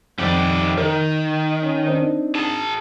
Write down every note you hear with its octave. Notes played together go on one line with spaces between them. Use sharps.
F2 D#3 G4 D5
D#3 A#4
C#4
C4 D4 D#4
G#4 A5